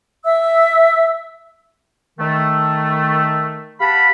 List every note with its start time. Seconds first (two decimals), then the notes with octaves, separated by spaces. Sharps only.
0.24 E5 E6
2.19 D#3 A3
3.79 G4 F5 F#5 A5 B5